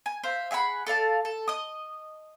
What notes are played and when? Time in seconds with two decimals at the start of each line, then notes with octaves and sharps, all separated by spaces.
0.06 G#5
0.23 C5 E5 F5
0.51 G#4 E5 F#5 B5
0.86 A4 D5 F5 A5
1.25 A4
1.48 D#5 D#6